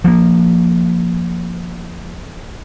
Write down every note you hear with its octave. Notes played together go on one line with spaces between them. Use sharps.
F3 A#3